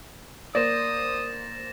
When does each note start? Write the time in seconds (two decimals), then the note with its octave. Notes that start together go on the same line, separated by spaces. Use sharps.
0.55 A#3 C5 D5 D#6 A6 A#6 E7